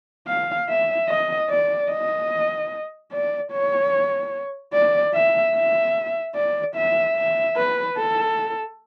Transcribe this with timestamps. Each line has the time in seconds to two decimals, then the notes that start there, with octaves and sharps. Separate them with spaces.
0.28 F5
0.69 E5
1.09 D#5
1.50 D5
1.91 D#5
3.12 D5
3.52 C#5
4.74 D5
5.14 E5
5.55 E5
6.36 D5
6.76 E5
7.16 E5
7.57 B4
7.98 A4